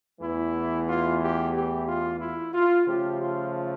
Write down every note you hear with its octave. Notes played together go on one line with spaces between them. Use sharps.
E2 E3 A3 E4
F4
G4
G4
F4
E4
F4
C#3 F3 A3 G4
F4